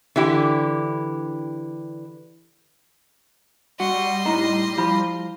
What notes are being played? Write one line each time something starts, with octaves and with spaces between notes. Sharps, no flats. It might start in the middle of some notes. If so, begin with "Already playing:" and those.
D3 E3 E4 G4
G3 F#4 D#5 C6
A2 D#4 E4 A#5
F3 E4 B5